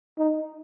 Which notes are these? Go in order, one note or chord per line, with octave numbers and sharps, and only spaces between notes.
D#4